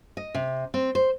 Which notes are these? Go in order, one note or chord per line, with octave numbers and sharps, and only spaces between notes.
D#5
C3
C4
C5